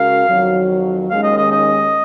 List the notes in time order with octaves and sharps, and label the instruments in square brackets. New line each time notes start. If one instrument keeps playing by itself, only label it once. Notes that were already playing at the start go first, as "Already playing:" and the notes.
Already playing: [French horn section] C#3 G#3 C#4 F#4 A#4 [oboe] F5
[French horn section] F2 D#3 F#3
[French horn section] D#2 D#3 G#3 C#4 [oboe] F5
[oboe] D#5
D#5
D#5